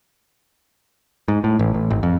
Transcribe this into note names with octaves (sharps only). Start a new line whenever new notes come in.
G#2
A2
A1
A1
G#1
F2